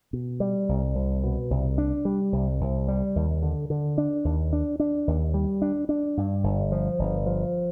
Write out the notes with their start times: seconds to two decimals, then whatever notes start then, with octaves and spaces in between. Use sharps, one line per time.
0.13 B2
0.40 G3
0.69 C2
0.95 C2
1.24 B2
1.50 C2
1.78 D4
2.05 G3
2.32 C2
2.61 C2
2.88 G3
3.16 D#2
3.43 D3
3.70 D3
3.98 D4
4.25 D#2
4.53 D4
4.80 D4
5.07 D#2
5.34 G3
5.62 D4
5.89 D4
6.17 G2
6.43 G1
6.72 F3
6.99 G1
7.26 F3